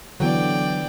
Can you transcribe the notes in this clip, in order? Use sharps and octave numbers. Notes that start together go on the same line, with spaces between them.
D3 E3 F#3 B3 D5 G5